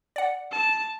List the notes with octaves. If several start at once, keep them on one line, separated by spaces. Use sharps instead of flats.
D5 F#5
A5